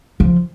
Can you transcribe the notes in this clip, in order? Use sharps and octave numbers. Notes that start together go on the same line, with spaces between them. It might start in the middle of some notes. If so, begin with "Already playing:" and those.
F3